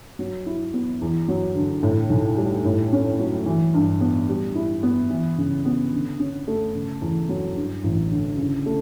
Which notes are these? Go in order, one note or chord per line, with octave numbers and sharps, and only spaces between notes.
F#3
E4
B3
E2
F#3
D3
A2
B1
G3
A2
C#4
F#3
E3
G2
B3
G3
E4
B3
E3
C#3
B3
D3
C#4
A3
C#3
E2
F#3
G2
A1
D3
C#3
A3